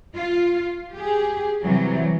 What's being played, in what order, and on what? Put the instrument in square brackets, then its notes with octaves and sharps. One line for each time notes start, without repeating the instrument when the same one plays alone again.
[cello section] F4
G4 G#4
C3 E3 F#3 G3